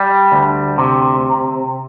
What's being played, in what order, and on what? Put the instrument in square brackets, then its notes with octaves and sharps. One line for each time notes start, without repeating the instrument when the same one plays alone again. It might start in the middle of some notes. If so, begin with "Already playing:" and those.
Already playing: [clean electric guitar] G3
D2
C3